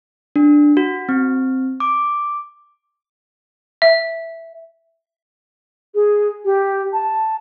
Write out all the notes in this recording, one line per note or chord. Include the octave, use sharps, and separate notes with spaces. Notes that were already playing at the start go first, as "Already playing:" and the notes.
D4
F#4
C4
D6
E5
G#4
G4
A5